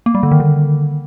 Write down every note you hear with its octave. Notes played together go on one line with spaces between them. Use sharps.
A#3
G3
D3
D#3
D3